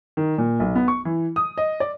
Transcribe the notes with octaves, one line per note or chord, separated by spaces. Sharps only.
D#3
A#2
B1
B3
C#6
E3
D#6
D#5
D5